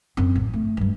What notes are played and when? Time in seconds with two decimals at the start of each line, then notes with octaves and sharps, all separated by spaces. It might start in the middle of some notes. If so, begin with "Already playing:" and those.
0.17 F#2 C4
0.36 A1
0.53 A3
0.77 G2 G#3